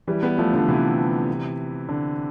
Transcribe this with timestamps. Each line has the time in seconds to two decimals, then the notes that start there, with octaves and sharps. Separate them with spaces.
0.07 E3 G3
0.23 G3 B3
0.38 F3 A3
0.53 D3 F3
0.68 C3 E3
1.89 D3